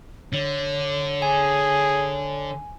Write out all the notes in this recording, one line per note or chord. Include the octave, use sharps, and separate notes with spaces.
D3 C#5
G#4 G#5